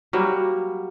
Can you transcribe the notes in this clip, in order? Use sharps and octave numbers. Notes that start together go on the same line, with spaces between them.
F#3 G3 A#3